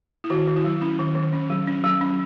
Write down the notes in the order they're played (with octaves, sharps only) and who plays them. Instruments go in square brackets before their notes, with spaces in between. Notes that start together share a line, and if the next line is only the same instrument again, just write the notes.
[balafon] E4
D#3 F#4
D#3
E4
F#3
C#4 E4
D#3
D#3
C#4
F#3
C#4
F#3
C#4